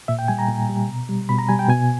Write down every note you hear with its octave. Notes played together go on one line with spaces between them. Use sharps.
A#2 E5
G5
G3 G#5
A#5
A#2
G3
B2
G3
B2 B5
A#5
G3 G#5
G5
B2 G#5